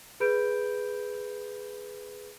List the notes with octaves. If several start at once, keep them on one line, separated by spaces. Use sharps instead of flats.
G#4 B4 B5 G6 D7